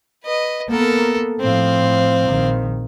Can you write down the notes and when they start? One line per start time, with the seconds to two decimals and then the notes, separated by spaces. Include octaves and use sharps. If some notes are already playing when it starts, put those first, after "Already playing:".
0.24 B4 D#5
0.69 A#3 B3 A4 A#4
1.40 A2 F3 C4 F5
2.28 A#1 D#3